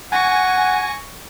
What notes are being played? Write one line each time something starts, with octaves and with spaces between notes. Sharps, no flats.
F#5 G#5 C#6 A#6